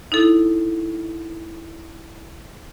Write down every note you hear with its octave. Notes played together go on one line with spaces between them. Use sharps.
D#4 E4 A4